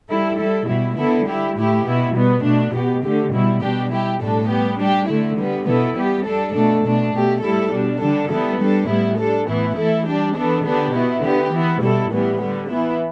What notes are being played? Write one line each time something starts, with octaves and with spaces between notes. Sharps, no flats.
G3 E4 A4
G3 E4 A4
B2 G3 E4
D3 B3 E4 A4
G3 E4 G4
A2 A3 E4 G4
B2 B3 E4
B2 G3 B3
B2 A3 D4
B2 B3 G4
D3 A3 G4
B2 G3 E4
B2 G3 D4 G4
G3 E4 G4
A2 G3 D4 A4
G3 B3 G4
G3 D4 G4
D3 A3 E4
D3 G3 B3
B2 B3 E4 A4
G3 B3 G4
G3 D4 A4
B2 A3 D4 A4
B2 A3 D4
B2 A3 G4
A2 G3 E4 A4
B2 G3 D4
D3 G3 D4 A4
G3 B3 E4 A4
G3 D4 A4
A2 G3 B3 E4
G3 D4 A4
A2 E3 B3 E4
E3 A3 E4 A4
G3 D4 G4
E3 B3 D4 A4
D3 B3 D4 G4
B2 B3 E4
D3 B3 G4
E3 B3 E4
B2 G3 E4 A4
A2 E3 G3 B3
D3 G3 B3
E3 B3 E4